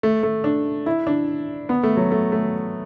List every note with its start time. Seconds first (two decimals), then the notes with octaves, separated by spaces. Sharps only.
0.03 A3
0.23 A3
0.44 D4
0.86 E4
1.07 D4
1.69 B3
1.83 A3
1.97 F#3
2.11 A3
2.32 A3